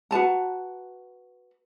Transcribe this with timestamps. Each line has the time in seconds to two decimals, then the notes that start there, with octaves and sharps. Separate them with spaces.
0.11 F#4 B4 A5 A#5